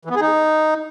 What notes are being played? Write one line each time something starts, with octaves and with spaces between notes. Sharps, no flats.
E3
B3
G#4
D#4